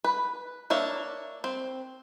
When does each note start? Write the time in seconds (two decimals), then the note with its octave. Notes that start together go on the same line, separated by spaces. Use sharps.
0.04 B4
0.70 A#3 D4 C#5 E5
1.44 C4